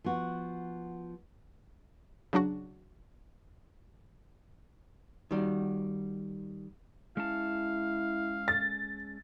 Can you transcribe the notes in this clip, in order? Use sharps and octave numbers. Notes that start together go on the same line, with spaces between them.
F3 B3 F#4
C#3 F#3 D4 F#4
D#3 G3 F#4
G#3 C#4 E4 F5 A5
A6